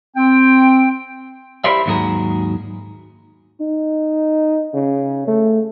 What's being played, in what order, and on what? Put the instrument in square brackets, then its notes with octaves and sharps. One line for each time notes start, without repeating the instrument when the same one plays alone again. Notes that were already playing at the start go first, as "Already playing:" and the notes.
[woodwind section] C4 G5
[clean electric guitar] E4 G4 A#4 C5 D5 E5
D#2 G#2 F#3 G#4 A#4
[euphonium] D#4
C#3
A3